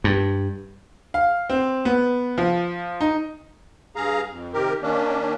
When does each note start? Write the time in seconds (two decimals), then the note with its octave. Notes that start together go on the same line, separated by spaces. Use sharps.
0.04 G2
1.14 F5
1.50 C4
1.85 B3
2.38 F3
3.01 D#4
3.96 G2 G#4 F5 A#5
4.30 F2
4.53 C3 D#3 G4 A#4
4.82 D#3 A#3 C#4 D4